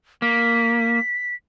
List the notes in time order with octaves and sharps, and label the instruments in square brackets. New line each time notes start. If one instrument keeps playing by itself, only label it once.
[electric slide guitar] A#3 [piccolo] B6